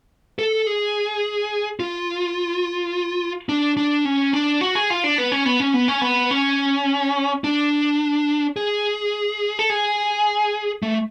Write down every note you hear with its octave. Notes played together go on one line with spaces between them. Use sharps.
A4
G#4
F4
D4
D4
C#4
D4
F#4
G#4
F4
D4
B3
C#4
B3
C#4
B3
C#4
B3
C#4
D4
G#4
A4
G#4
A3